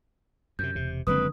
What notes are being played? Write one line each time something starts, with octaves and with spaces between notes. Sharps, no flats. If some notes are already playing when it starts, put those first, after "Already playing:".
F#2 C3 G6
E1 C3
F#1 D3 F3 G#3 C4 B4 D#6